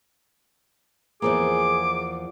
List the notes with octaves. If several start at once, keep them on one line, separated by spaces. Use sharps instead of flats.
E2 F3 A#3 G#4 D6